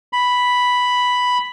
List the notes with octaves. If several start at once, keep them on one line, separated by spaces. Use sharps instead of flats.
B5